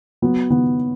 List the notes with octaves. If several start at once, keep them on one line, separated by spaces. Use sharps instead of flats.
F#3 B3
D#3 B3